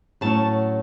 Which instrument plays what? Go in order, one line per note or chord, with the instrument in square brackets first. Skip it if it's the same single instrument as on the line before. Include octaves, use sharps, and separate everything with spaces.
[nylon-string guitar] A2 F#3 C#4 A5